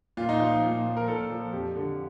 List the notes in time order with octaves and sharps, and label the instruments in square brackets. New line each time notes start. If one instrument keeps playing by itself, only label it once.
[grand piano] A#2 F4
D#4
F3 F4
A#2
F3
A#4
A#2 A4
F3
F2 G4
D3 F3